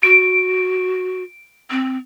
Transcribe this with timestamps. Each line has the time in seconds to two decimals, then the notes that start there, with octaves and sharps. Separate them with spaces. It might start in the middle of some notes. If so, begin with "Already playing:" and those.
0.03 F#4 D7
1.70 C4